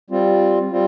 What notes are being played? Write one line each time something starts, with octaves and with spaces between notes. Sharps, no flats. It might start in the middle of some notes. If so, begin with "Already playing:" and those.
G3 C4 F4
G3 C4 F4